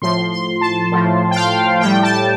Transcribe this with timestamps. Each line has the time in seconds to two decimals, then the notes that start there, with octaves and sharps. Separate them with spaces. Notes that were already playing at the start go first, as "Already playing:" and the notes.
0.02 A2 F3 C6
0.32 C6
0.61 A5
0.92 A2 F3
1.31 G5
1.36 F5
1.81 A2 G3 G5
2.03 A5